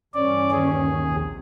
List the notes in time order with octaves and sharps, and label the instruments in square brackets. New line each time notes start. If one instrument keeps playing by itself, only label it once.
[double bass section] G2 E3 C#4 [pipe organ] D5
[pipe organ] D#2 G#4
[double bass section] A#1 C3